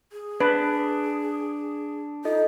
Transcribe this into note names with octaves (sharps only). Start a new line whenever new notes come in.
G#4
D4 B4
D#4 F4 A4 D#5